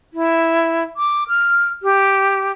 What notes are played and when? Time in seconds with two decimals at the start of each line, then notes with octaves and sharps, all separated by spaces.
0.13 E4
0.97 D6
1.28 F6
1.83 G4